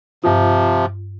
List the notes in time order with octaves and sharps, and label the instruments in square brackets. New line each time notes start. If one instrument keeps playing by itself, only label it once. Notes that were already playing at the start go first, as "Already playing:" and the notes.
[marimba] G2 F4 [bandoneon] C3 F3